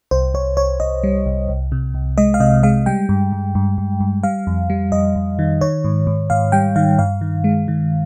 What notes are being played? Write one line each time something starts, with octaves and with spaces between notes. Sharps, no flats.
C2 C5
C2 C#5
C2 C#5
C2 D#5
G3
C2
C2
C3
C2
G#3 D#5
F5
C3 D#5
G#3 F5
G3 G5
G2
G2
G2
G2
G2
G3 F5
F2
G3
F2 D#5
F2
D#3
D#3 C#5
G#2
G#2
G#2 F5
G3 G5
D#3 F5
G2 F5
D#3
G#3
D#3